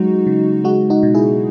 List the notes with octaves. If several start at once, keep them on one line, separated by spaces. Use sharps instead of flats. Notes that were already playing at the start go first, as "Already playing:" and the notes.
Already playing: F#3 G#3 D#4 F#4
C#3
G#3 D#4 F#4
D#4 F#4
B2
E4 G#4